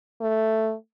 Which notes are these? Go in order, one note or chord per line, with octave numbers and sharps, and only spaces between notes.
A3